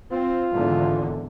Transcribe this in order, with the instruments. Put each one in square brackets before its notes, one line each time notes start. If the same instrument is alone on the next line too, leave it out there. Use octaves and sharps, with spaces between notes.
[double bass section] C4 [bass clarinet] F4
[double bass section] G#1 E2 D3